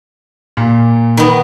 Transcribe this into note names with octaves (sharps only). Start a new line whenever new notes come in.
A#2
D#3 B3